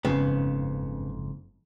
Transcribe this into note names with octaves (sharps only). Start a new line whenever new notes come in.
F#1 F2 G#2 C#3 B3